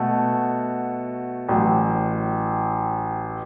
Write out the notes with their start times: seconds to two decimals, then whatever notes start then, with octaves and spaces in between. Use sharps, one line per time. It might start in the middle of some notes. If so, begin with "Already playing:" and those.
Already playing: B2 A3 F#4
1.49 A1 A2 F#3